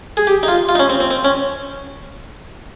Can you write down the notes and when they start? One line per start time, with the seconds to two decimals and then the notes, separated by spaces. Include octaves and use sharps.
0.17 G#4
0.27 G4
0.43 D#4
0.48 F4
0.69 F4
0.75 D#4
0.79 C#4
0.89 C4
1.00 C4
1.11 C4
1.24 C#4